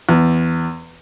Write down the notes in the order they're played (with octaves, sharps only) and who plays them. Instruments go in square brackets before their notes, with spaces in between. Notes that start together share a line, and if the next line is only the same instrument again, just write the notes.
[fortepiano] E2